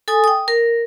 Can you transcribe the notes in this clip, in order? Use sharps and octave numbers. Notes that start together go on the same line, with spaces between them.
A4 G#5 D#6
G5 D#6
A#4